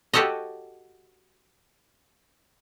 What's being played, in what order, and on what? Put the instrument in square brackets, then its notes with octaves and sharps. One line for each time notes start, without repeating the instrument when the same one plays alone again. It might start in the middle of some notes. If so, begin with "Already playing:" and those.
[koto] F#4 G4 A4 C#5 D#5